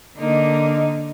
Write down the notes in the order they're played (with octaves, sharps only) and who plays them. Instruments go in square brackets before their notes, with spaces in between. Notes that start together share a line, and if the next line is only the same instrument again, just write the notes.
[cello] D3 D#4 [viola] A#3